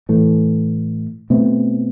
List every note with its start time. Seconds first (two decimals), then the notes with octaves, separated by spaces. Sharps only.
0.09 A2 E3 A3
1.30 B2 A3 C4